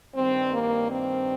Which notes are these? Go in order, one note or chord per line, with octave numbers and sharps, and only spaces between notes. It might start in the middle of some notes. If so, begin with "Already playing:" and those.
G2 D#3 G3 C4
A#3
C4